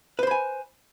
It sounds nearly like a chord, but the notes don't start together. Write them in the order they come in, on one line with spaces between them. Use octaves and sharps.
B4 C5 B5 G#5